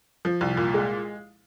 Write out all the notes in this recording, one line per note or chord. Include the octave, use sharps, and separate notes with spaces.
F3
C2
A#2
G#3